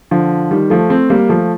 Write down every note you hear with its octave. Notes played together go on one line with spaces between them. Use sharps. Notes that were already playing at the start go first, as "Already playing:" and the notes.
D3 F3
D#3 G3
F3 A3
A3 C4
G3 A#3
F3 A3